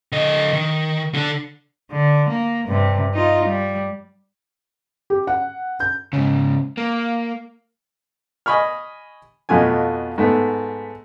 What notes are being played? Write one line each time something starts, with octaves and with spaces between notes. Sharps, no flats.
D3 D#5
D#3
D3 D4
D3
A#3
G2 C3
D#4 F4
G3
G4
F#5
G6
G#2 C#3
A#3
D#5 G#5 B5 C#6 F6
F2 B2 A3 F4 G#5
G#2 A3 B3